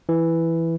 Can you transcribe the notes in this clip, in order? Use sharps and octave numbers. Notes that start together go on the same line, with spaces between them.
E3